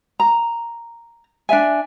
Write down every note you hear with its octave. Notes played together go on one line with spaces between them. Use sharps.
A#5
D4 D5 E5 G#5